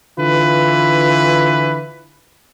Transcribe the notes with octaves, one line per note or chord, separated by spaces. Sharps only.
D3 E3 F4 B4